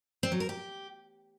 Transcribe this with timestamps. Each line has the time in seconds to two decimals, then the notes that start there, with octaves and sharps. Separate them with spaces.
0.23 C4
0.32 F#3
0.40 A#4
0.49 G4